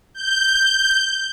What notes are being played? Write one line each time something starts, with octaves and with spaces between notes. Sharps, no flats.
G6